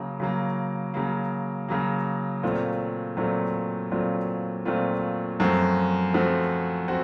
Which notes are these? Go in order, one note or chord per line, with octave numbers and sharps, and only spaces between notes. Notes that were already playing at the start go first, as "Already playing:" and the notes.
Already playing: C#3 F#3 A#3
C#3 F#3 A#3
C#3 F#3 A#3
C#3 F#3 A#3
A#2 F#3 A3 C4 F4
A#2 F#3 A3 C4 F4
A#2 F#3 A3 C4 F4
A#2 F#3 A3 C4 F4
F#2 F3 A3 C4 F#4
F#2 F3 A3 C4 F#4
C4 F#4